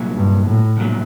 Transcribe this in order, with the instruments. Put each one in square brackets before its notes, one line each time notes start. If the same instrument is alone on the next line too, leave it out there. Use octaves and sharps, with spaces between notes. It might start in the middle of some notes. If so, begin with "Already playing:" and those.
Already playing: [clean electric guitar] C2 A#2 F#3
[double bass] G2
A2
[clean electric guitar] C2 A#2 F#3